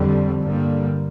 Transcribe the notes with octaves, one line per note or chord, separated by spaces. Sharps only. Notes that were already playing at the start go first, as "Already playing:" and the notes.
Already playing: F2 D3 G3
G2 D3 G3 A#3